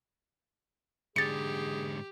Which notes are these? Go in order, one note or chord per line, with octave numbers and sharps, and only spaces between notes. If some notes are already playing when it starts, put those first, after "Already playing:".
G#2 D3 G4 G#4 A6 C#7